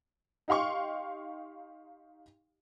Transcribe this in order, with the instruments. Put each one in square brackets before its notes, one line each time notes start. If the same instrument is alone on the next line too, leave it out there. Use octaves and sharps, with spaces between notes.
[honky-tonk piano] D#4 G4 F5 C6 C#6